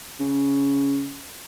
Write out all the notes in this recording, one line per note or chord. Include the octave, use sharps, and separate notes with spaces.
C#3